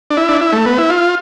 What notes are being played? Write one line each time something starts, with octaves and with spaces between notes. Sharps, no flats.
D4
E4
D4
E4
A3
B3
E4
F4